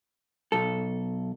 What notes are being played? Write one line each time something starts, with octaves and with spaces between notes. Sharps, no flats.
B1 A4